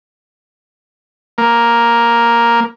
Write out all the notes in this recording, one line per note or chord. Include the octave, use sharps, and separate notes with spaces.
A#3